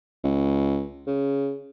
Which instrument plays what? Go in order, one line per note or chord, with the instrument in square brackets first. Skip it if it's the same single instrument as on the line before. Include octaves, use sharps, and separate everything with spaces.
[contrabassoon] C#2
C#3